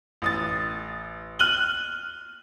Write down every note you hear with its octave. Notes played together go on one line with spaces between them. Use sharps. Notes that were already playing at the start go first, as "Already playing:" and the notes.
A1 D#6 A6
F6 F#6 D#7 F#7 G7